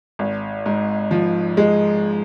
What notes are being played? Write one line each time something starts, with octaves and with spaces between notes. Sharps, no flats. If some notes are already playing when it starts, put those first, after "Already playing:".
G#1
G#2
F3
G#3